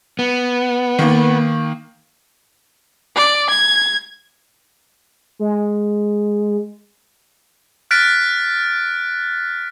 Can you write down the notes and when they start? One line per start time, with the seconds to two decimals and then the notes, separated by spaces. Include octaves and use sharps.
0.19 B3
0.99 D#3 A#3
3.16 D5
3.49 G#6
5.39 G#3
7.91 F6 F#6 A6 B6 D7